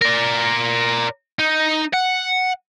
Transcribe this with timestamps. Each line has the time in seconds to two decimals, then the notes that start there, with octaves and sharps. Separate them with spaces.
0.01 A#4 D5
1.39 D#4
1.93 F#5